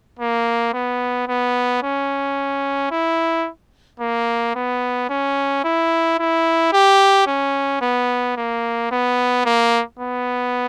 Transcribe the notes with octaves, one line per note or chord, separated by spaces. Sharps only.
A#3
B3
B3
C#4
E4
A#3
B3
C#4
E4
E4
G4
C#4
B3
A#3
B3
A#3
B3